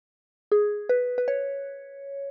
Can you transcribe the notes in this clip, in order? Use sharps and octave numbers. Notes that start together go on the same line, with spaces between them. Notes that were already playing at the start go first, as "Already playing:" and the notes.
G#4
B4
B4
C#5